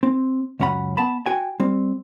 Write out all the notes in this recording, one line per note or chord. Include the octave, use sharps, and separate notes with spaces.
C4
C#2 F#2 C#4 F#5 B5
B3 A5 B5
F#4 G5 G#5
G3 C4